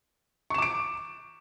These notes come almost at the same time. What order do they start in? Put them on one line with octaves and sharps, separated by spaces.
C#6 E7 D6 D7